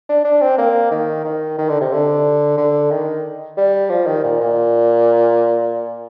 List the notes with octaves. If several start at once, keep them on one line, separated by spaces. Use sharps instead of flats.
D4
D4
C4
A#3
D#3
D#3
D#3
D3
C3
D3
D3
D#3
G3
F3
D#3
A#2
A#2